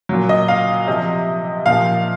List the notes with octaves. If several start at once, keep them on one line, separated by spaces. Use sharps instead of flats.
A#2 F#3
D#5
F5
C3 F3 D#5
A#2 F3 F5